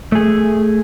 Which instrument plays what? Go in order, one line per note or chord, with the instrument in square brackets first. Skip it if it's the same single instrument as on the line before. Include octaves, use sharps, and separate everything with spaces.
[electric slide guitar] A3 G#4